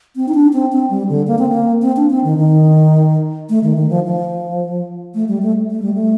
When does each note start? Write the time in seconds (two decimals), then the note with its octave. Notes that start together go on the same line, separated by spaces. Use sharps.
0.16 C4
0.28 D#4
0.34 D4
0.53 C4
0.72 C4
0.90 G3
1.09 D3
1.27 A#3
1.38 C4
1.49 A#3
1.82 C4
1.96 D4
2.10 C4
2.24 D#3
2.38 D#3
3.49 A3
3.63 D#3
3.77 D#3
3.90 F3
4.04 F3
5.15 A3
5.28 G3
5.42 A3
5.70 A3
5.82 G3
5.94 A3